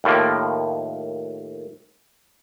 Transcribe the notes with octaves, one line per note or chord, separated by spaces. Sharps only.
D#2 A2 F3 A#3